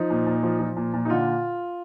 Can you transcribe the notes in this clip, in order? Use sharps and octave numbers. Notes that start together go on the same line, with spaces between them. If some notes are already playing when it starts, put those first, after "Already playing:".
Already playing: F3 D#4
A#2
A#2
F3
F3
A#2
A#2
D#4
D3 F4